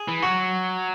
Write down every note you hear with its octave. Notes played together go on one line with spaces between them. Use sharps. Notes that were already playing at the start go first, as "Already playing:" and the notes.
Already playing: G#4
E3
F#3 F#4